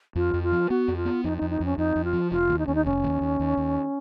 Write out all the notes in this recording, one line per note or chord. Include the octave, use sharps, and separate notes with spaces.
F2 F4
F2
F4
F3
B3 F#4
F2
F4
B3
F2 D#4
D#4
F2
D#4
F2 C#4
F2 D#4
F2
F4
F3
F1 F4
D#2
D#4
D#2 C#4
D#4
F1 C#4
D#2
D#2
D#2
D#2